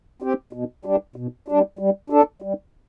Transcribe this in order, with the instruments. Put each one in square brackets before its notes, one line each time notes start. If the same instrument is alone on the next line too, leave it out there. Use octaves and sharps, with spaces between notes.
[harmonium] C4 G4
B2
G3 D4
B2
G3 D4
G3
D4 A4
G3